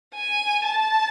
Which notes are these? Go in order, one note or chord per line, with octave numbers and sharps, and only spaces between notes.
G#5
A5